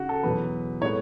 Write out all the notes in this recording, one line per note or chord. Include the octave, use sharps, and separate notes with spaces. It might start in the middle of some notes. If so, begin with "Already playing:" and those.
Already playing: C#3 F#4
A4
E2 B2 F#3 B4
A2 G#3 B3 C#5